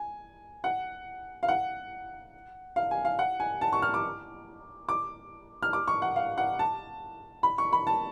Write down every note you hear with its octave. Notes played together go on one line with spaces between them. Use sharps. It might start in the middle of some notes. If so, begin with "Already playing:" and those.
Already playing: G#5
F#5
F5
F#5
F5
G#5
F5
F#5
G#5
A5
C#6
F6
D6
D6
F6
D6
C#6
F#5
F5
F#5
A5
B5
C#6
B5
A5